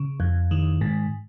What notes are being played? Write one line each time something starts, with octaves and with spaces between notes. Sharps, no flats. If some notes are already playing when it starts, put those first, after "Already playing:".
Already playing: C#3
F2
D#3
G#2